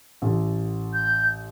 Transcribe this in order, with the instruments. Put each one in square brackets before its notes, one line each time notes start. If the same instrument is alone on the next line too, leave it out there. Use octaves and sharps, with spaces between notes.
[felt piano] A1
[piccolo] G6